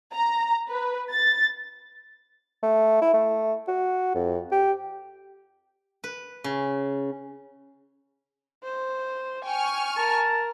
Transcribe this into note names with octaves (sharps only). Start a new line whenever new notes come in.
A#5
B4
A6
A3
E4
A3
F#4
F2
G4
B4
C#3
C5
G5 G#5 C#6 F6
A#4 A5